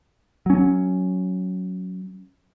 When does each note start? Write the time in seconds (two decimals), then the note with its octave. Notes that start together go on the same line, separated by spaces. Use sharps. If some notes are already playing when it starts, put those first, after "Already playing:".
0.46 F#3 C#4